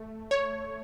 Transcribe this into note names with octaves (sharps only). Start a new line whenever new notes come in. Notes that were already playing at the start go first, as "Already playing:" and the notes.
Already playing: A3
C#5